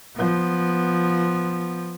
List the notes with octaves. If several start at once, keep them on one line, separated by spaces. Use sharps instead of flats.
F3 B3